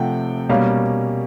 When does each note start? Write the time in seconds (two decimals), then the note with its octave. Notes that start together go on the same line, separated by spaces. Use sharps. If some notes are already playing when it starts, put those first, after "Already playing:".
Already playing: C3 F3 A3 F#5 G5
0.49 B2 G3 A#3 C#4 F5